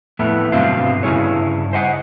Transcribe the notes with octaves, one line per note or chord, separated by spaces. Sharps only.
F2 A2 A3 B3 E4
G2 B2 D3 F#3 C4 F4
G2 C#3 C#4 E4 G#4 C#5
C5 D#5 F#5